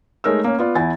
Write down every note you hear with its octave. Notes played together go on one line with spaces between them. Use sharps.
G#3 A3 D#4 A#4 C#5 E6
A#3 C#4
B3 F4 D5
E2 E4 G#5 A6